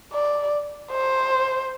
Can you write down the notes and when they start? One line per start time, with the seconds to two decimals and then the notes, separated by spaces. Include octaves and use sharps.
0.13 D5
0.92 C5